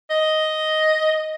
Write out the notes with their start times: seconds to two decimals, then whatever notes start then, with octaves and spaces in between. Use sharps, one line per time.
0.10 D#5